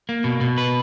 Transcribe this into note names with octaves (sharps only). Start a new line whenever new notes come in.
A#3
B2
B2
B4